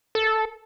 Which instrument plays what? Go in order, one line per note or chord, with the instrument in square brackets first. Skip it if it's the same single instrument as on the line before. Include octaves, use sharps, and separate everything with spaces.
[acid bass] A4